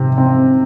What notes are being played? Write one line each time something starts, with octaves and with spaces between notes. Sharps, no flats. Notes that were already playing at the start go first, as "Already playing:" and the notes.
Already playing: C3 C4
C4